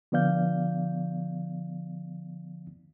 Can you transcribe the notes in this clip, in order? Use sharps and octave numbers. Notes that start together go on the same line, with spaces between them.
D3 F3 B3 D5 F5 G6